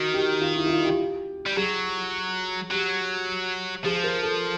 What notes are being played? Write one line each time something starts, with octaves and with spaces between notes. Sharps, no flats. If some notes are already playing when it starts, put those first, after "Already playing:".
Already playing: D#3 F#4
G4
F4
E4
E4
F4
G4
G3
F#3 G#4
F#3 G4
F3 G#4
A#4
A4